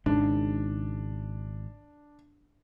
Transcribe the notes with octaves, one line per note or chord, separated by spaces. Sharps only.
G#1 G#2 C#3 D4